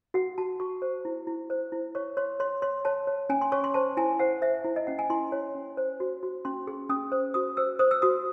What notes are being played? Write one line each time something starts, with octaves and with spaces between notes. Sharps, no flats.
F#4 F#5
F#4 A5
F#4 C#6
C5
E4
E4
C5
E4
C#5 C#6
C#5 C6
C#5 C6
C#5 C6
C#5 A5
C#5
C#4 G#5
C6
C#5 C#6
C6
C5 A5
E4 G#5
C5 F#5
C5 E5
E4
D#5
C#4 F#5
G#5
E4 C6
C#5
C#4
C5
F#4
F#4
C#4 C6
G#4
C#4 D#6
C5
F#4 D#6
C5 E6
C5 D#6
E6
F#4 D#6